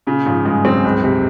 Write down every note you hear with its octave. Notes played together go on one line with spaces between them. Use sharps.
A#2 C#3
G#2 F3
G2 G#3
F#2 C4
C#2 G2
C3